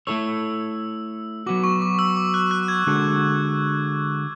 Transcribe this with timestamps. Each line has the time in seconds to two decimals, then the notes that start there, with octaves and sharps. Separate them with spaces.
0.07 A3 E4 A4 C#5 E6
1.46 F#3 B3 F#4 D6
1.64 C#6
1.82 D6
1.99 E6
2.17 D6
2.34 F#6
2.51 F#6
2.68 G#6
2.87 D3 G#3 D4 F#4 A4